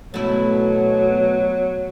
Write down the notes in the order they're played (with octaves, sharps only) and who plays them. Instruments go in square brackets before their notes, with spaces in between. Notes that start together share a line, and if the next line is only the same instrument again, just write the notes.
[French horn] B2 [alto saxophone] F#3 [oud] A3 E4